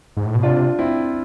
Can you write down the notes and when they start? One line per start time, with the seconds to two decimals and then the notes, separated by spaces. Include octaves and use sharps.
0.17 G#2
0.25 A2
0.35 B2
0.43 C3 D4 F4
0.79 C4 E4